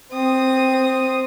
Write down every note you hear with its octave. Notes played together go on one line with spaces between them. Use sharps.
C4 D#6